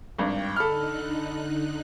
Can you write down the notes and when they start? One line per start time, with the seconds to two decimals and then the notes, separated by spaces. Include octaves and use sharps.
0.18 G#1 G2 G5
0.56 D3 D#4 A4 B5 F6 F#6